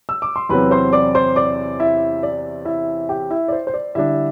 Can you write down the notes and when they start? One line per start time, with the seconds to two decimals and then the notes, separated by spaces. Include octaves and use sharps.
0.09 E6
0.22 D6
0.36 C6
0.49 E2 C3 F#3 C4 B4 B5
0.71 C5 C6
0.93 D5 D6
1.15 C5 C6
1.36 D5 D6
1.80 E4 E5
2.23 D5
2.65 E4 E5
3.09 G4 G5
3.30 E4 E5
3.48 D5
3.52 C5
3.67 C5
3.74 D5
3.95 D3 G3 D4 E4 E5